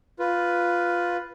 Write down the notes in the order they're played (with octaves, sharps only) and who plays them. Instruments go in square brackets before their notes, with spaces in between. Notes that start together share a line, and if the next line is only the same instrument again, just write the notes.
[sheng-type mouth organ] F4 B4